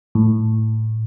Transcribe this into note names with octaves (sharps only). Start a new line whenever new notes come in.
A2